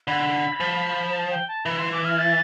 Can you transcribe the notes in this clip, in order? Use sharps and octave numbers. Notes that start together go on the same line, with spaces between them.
D3 B5
F3
A5
G5
A5
E3 B5
C6
D6
F6
A6